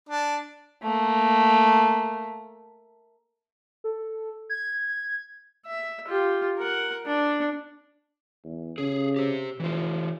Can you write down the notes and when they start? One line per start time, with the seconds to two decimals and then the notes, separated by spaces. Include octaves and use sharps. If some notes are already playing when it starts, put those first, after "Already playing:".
0.09 D4
0.83 A3 A#3
3.84 A4
4.50 G#6
5.66 E5
6.08 F4 G4
6.58 A#4 F#5
7.06 D4
8.45 E2
8.78 C#3 G#4 A4
9.16 G4 C5
9.60 F1 E3 F4